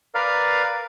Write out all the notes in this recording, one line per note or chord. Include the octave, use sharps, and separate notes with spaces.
A#4 B4 D5 F5